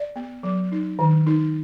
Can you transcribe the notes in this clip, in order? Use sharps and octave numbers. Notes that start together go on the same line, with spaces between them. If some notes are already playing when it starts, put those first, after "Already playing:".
Already playing: D5
B3
F#3
D#4
D#3
D#4